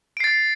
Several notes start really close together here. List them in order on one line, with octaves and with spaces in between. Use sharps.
D7 C7 A6